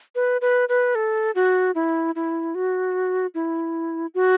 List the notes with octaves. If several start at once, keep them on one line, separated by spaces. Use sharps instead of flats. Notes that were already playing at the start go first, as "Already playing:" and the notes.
B4
B4
B4
A4
F#4
E4
E4
F#4
E4
F#4